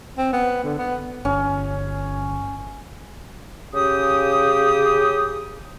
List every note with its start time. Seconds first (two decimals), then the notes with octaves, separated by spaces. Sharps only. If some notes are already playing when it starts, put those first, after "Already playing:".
0.18 C4
0.33 B3
0.64 D3
0.78 B3
1.25 G1 C#4
3.74 C#3 G4 D#6